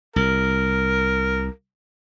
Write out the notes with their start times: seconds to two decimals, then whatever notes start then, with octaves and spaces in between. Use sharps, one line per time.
0.16 C2 A#4